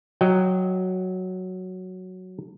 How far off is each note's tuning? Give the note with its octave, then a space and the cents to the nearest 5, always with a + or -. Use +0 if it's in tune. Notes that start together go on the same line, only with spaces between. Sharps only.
F#3 +0 D#5 +0 G5 -15